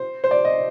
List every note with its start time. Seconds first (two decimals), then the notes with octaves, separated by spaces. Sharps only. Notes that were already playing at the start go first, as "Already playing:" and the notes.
Already playing: C5
0.24 C5
0.31 D5
0.45 D#5